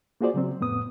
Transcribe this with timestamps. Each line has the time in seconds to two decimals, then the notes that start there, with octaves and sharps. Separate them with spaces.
0.21 A#3 F4 F#4 G#4 C5 D5
0.34 C#3 F#3 C4
0.61 F2 A2 B3 D#6